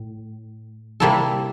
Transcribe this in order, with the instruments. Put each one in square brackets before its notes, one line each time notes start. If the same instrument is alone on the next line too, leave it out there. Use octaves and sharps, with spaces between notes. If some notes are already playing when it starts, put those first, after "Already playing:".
Already playing: [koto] A2
C3 G3 A#3 E4 A4